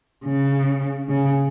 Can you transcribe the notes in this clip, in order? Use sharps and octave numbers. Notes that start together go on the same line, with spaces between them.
C#3
C#3